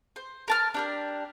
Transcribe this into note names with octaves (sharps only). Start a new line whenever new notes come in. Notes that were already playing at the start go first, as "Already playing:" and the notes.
C5
A#4 A5 F6
D4 G4 A#4